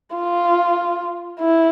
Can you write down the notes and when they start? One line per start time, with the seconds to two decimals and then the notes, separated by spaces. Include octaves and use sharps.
0.16 F4
1.41 E4